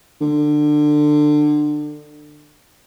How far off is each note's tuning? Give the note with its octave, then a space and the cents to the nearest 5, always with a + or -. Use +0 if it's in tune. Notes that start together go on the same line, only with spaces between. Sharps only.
D3 +25